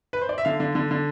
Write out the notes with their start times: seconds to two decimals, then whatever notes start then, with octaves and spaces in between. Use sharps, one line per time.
0.13 B4
0.21 C5
0.29 D5
0.38 E5
0.45 D3 F5
0.60 D3
0.75 D3
0.91 D3